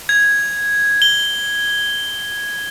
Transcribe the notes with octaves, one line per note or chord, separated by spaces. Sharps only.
G#6
G7